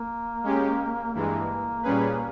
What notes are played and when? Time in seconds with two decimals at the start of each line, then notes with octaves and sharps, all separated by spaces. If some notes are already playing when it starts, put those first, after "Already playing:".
Already playing: A#3
0.43 G#3 C#4 G4
1.14 G2 E3 G#3 A#3
1.83 A#2 G3 C#4 G#4 B4